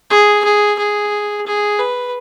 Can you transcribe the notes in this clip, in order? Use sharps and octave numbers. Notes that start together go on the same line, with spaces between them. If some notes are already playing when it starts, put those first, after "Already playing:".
G#4
G#4
G#4
G#4
B4